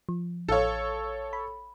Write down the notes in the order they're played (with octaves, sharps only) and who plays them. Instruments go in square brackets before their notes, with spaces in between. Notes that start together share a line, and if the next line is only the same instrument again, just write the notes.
[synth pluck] F3
[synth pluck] A1 F5 [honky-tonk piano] A4 C#5
[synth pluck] B5